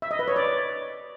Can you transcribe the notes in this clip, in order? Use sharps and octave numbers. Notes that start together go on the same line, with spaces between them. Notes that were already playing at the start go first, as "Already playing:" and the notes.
E5
D#5
B4
C#5
D5